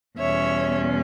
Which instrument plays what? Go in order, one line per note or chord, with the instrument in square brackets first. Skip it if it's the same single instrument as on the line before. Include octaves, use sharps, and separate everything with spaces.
[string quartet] E2 B2 G3 C#4 C#5 E5